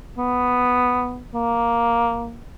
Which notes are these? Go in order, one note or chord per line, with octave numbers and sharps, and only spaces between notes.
B3
A#3